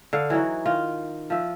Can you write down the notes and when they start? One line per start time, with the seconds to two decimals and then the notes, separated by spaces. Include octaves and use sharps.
0.13 D3 F5
0.30 E3 F#3 D#4 F#4
0.66 D#3 F4
1.30 F3 E5